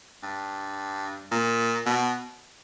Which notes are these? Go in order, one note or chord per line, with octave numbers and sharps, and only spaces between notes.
G2
A#2
B2